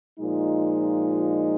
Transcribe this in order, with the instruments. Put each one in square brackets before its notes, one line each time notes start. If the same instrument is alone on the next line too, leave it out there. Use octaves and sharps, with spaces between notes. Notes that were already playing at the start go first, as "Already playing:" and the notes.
[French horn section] A#2 F3 G#3 D#4